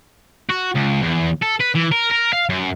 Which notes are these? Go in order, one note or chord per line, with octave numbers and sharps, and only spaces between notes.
F#4
C#2
E2
A4
B4
E3
A#4
A#4
F5
F#2